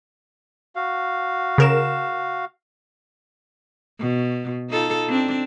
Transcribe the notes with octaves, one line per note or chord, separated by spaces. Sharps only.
F#4 F5
C#3 A#4 E7
B2
D#4 F4 A4
C4 D4